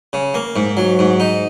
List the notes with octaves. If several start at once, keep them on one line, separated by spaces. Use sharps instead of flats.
C#3
A#3
G#2
F#3
G#2
D#4